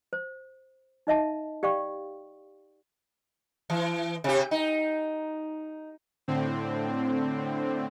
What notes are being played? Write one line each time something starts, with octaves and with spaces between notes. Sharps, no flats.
C5
D#4 D#5 E5 A5
G4 D5 F5 G5 C#6
E3
C3 G4
D#4
A2 D3 C4